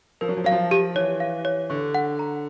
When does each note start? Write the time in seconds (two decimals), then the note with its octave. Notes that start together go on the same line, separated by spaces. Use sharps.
0.21 F3 A#4
0.28 F#3
0.37 F3
0.44 F#3 F5
0.51 F3
0.71 G4
0.95 E3 C#5
1.20 F5
1.45 C#5
1.70 D3 C#6
1.94 F#5
2.19 A#5